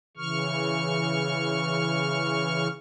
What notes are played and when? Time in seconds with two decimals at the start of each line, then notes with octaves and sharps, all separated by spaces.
0.17 C#3 E3 C#6 F6